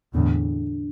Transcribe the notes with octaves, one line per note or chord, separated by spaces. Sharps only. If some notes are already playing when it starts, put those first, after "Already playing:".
E2 A2 D3